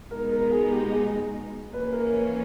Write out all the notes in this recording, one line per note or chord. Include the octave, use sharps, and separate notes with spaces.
B2 G#3 B3 D#4 A#4
A#4
G#4
G4
G#4
E3 A#3 C#4 B4
A#4
B4